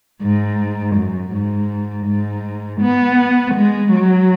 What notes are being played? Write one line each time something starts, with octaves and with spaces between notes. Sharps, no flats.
G#2
F#2
G#2
G#2
B3
G#3
F#3